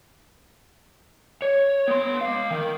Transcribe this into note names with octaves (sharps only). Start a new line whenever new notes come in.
C#5
B3 C6
G#3 F5
D#3 A#4